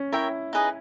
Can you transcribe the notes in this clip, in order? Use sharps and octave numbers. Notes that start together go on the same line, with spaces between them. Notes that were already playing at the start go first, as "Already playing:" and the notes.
Already playing: C#4
E4 A#4 C#5 E5 G5
D#4 G#4 B4 D#5